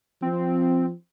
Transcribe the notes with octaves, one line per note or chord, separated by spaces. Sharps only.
F3 C4